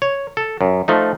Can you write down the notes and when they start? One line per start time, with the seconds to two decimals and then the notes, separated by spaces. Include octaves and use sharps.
0.02 C#5
0.37 A4
0.61 F#2
0.88 F3 A3 D#4